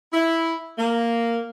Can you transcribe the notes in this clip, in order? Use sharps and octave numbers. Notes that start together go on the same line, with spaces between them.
E4
A#3